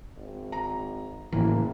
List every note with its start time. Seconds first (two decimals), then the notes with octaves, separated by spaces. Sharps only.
0.17 G#1
0.52 A#5
1.32 F#1 A2 E3 A#3